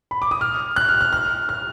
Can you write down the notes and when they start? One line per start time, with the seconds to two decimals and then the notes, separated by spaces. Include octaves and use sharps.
0.11 B5
0.22 D6
0.31 D#6
0.41 F6
0.76 F#6
0.89 F6
1.01 F6
1.13 F6
1.49 F6